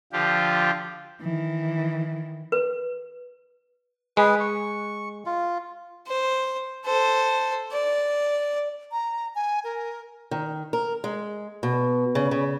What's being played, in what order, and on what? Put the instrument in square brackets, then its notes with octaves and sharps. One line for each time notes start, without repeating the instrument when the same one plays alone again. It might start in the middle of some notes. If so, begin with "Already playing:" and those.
[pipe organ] D3 F3 F4 G4
[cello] D#3 E3
[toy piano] B4
[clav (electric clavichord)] G#3 [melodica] G#4 B4
[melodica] C#6
F4
[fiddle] C5
A4 C5
D5
[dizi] A#5
G#5
A#4
[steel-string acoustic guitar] D#3
A#4
G#3
B2
C#3
C#3